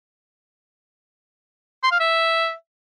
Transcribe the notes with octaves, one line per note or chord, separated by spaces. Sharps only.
C6
F5
E5